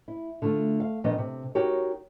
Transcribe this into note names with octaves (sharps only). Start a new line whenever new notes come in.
E4
D3 A3 F4
F5
A#2 D#3 F3 B3 D4 D#5
C3
D#4 F#4 G4 A#4 C#5